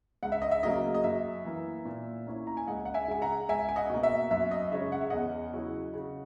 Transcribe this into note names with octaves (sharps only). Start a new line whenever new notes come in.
C#2 F#5
E5
D#5
E5
C#3 F#3 A#3 D#5
D#5
F#2 E5
E3 A#3
A#2
A#3 C#4 E4
A#5
G#5
C#2 D#5 F#5
F#5
E5 G#5
C#3 G#3 G#5
F#5 A#5
C#2 E5 G#5
G#5
D#5 F#5
B2 A#3
E5
F#2 E5
D#5
C#3 G#3 C#4 E5
F#5
E5
E2 D#5 F#5
C#3 F#3 C#4 E4
C#3